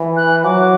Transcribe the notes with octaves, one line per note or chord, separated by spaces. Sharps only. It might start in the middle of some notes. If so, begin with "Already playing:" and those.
Already playing: E3
F#6
F#3 D6